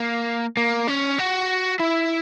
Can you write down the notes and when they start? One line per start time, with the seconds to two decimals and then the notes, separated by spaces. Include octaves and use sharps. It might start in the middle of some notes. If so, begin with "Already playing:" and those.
Already playing: A#3
0.57 A#3
0.88 C#4
1.18 F#4
1.79 E4